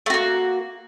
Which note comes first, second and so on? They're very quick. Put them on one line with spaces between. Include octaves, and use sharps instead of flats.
A3 F#4 A#3